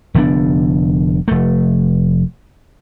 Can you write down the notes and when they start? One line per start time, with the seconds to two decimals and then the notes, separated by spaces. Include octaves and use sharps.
0.14 F1 D3 B3 D4
1.28 F1 A3